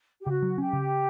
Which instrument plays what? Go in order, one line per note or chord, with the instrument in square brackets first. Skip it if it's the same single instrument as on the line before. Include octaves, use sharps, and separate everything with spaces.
[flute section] G4
[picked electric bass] C#3 [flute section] F#4
[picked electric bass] F#3
[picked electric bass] C#4 [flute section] G4
[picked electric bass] C#3